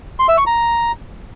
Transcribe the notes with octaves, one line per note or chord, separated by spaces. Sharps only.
C6
E5
C#6
A#5